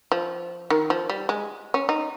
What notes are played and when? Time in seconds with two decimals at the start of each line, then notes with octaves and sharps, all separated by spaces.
0.12 F3
0.70 D#3
0.90 F3
1.10 G3
1.29 G#3
1.74 C#4
1.89 D#4